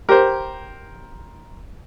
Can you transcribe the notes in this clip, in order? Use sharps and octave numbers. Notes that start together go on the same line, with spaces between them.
G4 A#4 C5